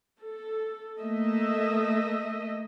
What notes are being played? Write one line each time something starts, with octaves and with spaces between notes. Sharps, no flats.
A4
A3 A#3 D#5 E5